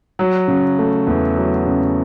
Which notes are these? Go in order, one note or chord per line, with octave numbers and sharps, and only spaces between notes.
F#3
C#3
A3
E2
F#3
C#3